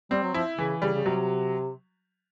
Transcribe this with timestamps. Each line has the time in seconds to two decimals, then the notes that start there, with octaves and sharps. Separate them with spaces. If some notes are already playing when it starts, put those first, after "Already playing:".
0.11 G3 C4
0.23 F#3
0.34 F3 E4
0.57 C#3 E3
0.82 C#3 G3
0.94 C#3
1.04 C3 F#3